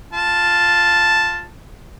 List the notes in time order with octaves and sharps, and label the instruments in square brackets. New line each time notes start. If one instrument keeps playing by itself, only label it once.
[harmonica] F4 A5